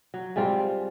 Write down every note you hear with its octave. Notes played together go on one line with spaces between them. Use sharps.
F#3
G#2 G3 C4 F4